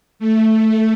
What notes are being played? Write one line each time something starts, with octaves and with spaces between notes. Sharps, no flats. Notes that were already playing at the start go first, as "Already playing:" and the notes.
A3